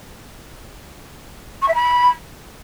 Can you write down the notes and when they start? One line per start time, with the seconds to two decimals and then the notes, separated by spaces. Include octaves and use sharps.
1.62 C#6
1.68 E5
1.75 B5